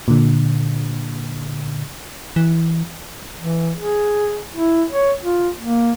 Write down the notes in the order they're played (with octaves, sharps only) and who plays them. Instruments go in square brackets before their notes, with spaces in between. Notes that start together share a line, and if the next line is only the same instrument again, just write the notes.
[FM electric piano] A#2 D3
[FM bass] E3
[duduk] E3
G#4
E4
C#5
F4
A#3